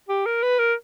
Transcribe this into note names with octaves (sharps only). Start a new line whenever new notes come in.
G4
A#4
B4
A#4